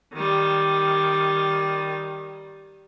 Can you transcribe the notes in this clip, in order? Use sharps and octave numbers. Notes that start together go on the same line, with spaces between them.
D#3 G3